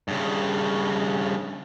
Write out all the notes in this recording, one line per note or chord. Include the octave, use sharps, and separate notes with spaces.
G2 C#3